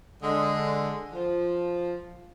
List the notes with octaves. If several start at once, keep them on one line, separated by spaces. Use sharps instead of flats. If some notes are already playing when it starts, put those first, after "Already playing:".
D3 G#3
F3